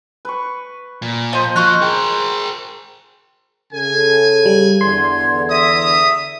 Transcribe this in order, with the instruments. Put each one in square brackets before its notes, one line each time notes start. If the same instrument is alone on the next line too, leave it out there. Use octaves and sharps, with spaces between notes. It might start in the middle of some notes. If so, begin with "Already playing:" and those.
[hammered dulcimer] B4 C#6
[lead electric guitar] A#2
[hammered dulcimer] F3 C5 [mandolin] D#5
[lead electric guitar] F2 D#5 [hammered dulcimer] F#4 [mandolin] C#6 F6 F#6
[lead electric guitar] G#4 A#4 [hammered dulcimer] G5
[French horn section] C#3 A4 [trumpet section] G#5
[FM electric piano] G3
[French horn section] E2 D3 [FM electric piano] C6 [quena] G#6
[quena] E5 [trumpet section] A#5 D#6